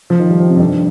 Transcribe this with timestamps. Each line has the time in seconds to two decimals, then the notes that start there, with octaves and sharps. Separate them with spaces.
0.10 F3
0.20 D#3
0.30 G3
0.40 F3
0.50 C3
0.56 F2
0.60 G2